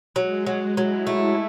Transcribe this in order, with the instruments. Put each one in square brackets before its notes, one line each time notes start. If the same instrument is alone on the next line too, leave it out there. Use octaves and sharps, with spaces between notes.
[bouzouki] F#3 [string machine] G#3
[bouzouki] F#3
[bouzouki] F#3 [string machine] E4
[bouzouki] A3 [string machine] E4